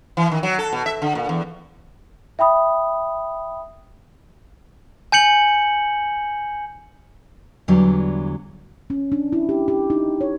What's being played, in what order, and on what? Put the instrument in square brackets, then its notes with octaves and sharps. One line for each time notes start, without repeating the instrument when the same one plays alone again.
[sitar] E3
D#3
F#3
A4
B2
E5
D3
A#2
E2
[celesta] E5 G5 B5 D#6
[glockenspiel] G#5 G6 C#7 F#7
[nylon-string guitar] E2 D3 E3 F#3 G3
[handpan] C#4
D4
E4
G4
G4
D#4
C#5